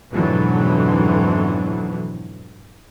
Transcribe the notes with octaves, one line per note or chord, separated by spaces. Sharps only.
F2 G#2 B2 D3 E3 F#3